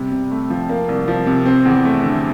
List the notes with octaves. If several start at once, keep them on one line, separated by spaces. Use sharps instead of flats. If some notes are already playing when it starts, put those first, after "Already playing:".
Already playing: C3 G3
C3
A3
F3
A#3
C2
F3
C3
C4
E2
A3
D3